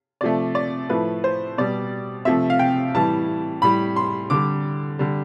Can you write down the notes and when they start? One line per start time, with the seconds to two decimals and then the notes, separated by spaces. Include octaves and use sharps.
0.21 C3 F3 A3 D5
0.55 D5
0.90 A2 F3 A3 B4
1.24 C5
1.58 B2 G3 D5
2.25 C3 F3 A3 E5
2.50 F5
2.59 G5
2.95 A2 E3 G3 A5
3.62 A2 G3 B5
3.96 C6
4.30 D3 G3 D6
4.99 D3 G3